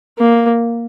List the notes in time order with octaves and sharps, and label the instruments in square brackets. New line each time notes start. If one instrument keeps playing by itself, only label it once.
[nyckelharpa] A#3